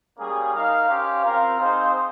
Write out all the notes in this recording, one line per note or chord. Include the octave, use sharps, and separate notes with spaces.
G3 A#3 C#4 G#4
D#4 A#4 F5
C#4 G4 C5 F5
C4 F4 A#4 F5
C4 D#4 G#4 C5 F5